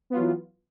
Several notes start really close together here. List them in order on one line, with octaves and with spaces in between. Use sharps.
B3 F4 F#3 E3